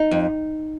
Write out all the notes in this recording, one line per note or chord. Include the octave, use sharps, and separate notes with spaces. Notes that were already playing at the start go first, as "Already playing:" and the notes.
Already playing: D#4
F2